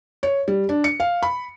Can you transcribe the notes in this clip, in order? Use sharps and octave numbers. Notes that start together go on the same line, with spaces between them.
C#5
G3
D4
C#7
F5
B5